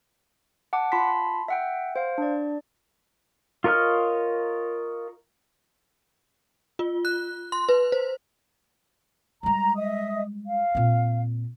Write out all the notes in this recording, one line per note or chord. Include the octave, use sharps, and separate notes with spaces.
F#5 A5 D6
F4 A5 B5 C6 B6
E5 F#5 G5
C5 F5
D4 D5
F4 A#4 C#5 D#5 F6
F4
F#6
C6
B4
C5
G3 G#3 A#5
D#5 E5 D#6
F5
A#2 C4